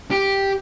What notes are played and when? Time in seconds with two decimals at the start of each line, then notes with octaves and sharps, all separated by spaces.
0.11 G4